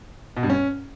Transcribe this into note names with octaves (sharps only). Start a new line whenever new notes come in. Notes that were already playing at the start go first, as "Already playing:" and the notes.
B2
G2
C#4